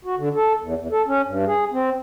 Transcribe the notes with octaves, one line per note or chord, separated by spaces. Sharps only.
F#4
D3
A4
E2
E2
A4
C#4
G2
G#4
C4